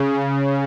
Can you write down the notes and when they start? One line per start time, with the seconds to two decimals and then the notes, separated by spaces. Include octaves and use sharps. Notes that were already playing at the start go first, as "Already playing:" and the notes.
Already playing: C#3